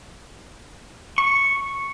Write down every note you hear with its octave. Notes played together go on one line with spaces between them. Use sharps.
C#6